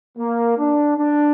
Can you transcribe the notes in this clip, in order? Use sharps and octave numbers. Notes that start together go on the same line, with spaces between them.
A#3
D4
D4